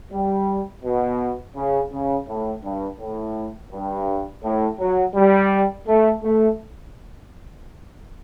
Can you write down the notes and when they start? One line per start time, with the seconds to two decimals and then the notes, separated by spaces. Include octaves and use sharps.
0.12 G3
0.84 B2
1.56 C#3
1.92 C#3
2.28 A2
2.63 G2
2.99 A2
3.72 G2
4.43 A2
4.79 F#3
5.15 G3
5.87 A3
6.23 A3